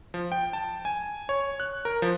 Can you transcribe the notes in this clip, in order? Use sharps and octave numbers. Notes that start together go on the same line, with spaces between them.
F3
G5
A5
G#5
C#5
F#6
A#4
F3